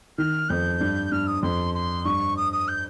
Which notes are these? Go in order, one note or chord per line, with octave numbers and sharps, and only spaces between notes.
D#3 F6
F2 G6
G2
G2 F6
D#6
F2 C6
C6
G2 C#6
D#6
D#6
G6